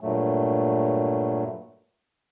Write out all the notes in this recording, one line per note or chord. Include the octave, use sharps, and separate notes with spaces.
G2 A#2 F#3 A3